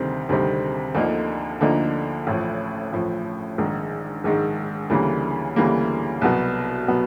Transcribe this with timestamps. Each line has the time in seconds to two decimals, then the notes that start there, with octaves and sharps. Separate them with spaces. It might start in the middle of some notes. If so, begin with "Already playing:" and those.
Already playing: D2 C3 D#3 G3 C4
0.29 D2 C3 D#3 G3 C4
0.95 D2 D3 F3 A#3 D#4
1.61 D2 D3 F3 A#3 D#4
2.27 A1 A2 F3
2.93 A1 A2 F3
3.58 A#1 G#2 D#3 G#3
4.24 A#1 G#2 D#3 G#3
4.90 D2 C#3 E3 G3 A#3
5.56 D2 C#3 E3 G3 A#3
6.21 C2 B2 F#3 B3
6.88 B2 F#3 B3